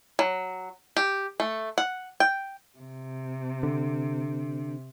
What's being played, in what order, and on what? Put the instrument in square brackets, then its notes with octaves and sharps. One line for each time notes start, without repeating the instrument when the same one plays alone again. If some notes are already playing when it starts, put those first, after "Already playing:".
[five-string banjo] F#3
G4
A3
F#5
G5
[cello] C3
[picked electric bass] D3